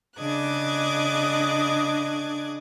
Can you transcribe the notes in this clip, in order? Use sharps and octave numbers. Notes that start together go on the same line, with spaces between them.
C#3 D4 D#5 D6 F#6 G#6